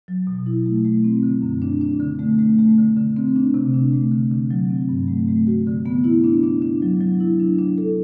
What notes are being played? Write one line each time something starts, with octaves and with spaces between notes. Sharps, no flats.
F#3
B2
E4
A3
A3
C4
D3
F#2
D4
D4
D3
A3
A3
A3
D3
D3
C4
D4
C3
D4
A3
D3
D3
F#3
C4
G2
A3
A3
F#4
D3
B3
E4
D4
D4
D4
F#3
F#3
E4
D4
D4
A4